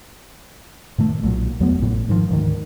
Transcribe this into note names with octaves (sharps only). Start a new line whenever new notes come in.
A2 D#3 A3
B1 A#2 D#3 F#3
E2 F#3 A3 B3
A1 A2
G#2 D#3 F3
D2 G#2 D#3